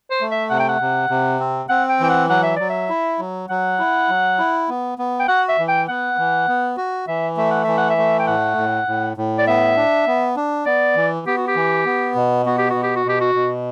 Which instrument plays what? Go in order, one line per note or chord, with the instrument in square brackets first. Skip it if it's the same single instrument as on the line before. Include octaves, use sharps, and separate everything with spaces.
[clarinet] C5
[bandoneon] A3
[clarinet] E5
[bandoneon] C3 [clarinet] F#5
[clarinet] G5
F#5
[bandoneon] C3
C3
C4
[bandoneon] C4 [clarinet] F#5
[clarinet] G5
[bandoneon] E3 [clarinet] G5
[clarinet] F#5
[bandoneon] F#3 [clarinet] F#5
[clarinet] E5
[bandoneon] F#3 [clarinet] D5
[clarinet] E5
[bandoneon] E4
F#3
[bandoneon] F#3 [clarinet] F#5
[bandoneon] E4
F#3
E4
B3
B3
[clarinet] G5
[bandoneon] F#4 [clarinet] F#5
[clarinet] E5
[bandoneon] E3
[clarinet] G5
[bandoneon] B3 [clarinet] F#5
[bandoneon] E3
B3
F#4
[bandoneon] E3 [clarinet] E5
[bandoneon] A3 [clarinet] E5
[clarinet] F#5
[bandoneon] E3 [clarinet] E5
[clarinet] F#5
E5
[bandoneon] A3
[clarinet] G5
[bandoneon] A2 [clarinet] F#5
[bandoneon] A2
A2
A2
[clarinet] D5
[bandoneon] B3 [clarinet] E5
[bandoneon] D4
B3
D4
[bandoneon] B3 [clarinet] D5
[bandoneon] E3
[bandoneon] B3 [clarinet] G4
[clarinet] F#4
G4
[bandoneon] E3
B3
B2
[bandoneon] B3 [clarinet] F#4
[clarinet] G4
[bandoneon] B2 [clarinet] F#4
[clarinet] G4
F#4
[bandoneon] B2 [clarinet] G4
[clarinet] F#4
[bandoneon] B2